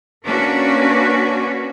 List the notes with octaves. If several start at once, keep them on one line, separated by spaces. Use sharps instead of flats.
A#3 C#4 D4 F#4 B4